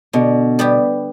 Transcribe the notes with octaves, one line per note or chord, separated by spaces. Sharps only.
B2 D3
G3 B3 G4